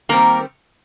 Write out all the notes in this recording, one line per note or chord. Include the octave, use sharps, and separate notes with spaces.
D#3 G3 A#3 C4 A#4